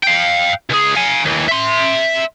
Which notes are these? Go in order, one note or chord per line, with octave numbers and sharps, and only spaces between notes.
F5 G5
C#2 G#4
F5 G#5
D#2 E3
E5 C6